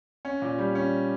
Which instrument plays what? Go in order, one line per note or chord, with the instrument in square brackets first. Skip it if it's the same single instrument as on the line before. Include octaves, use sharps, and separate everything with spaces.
[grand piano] C#4
A#2
G3
C#4